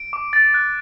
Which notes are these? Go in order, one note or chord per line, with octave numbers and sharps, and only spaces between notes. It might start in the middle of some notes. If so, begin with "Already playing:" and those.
Already playing: D7
D6
A6
F#6